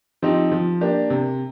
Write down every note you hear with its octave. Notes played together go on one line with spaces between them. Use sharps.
F3 C4 D#4 G4
F3
A#3 D4 G4
C3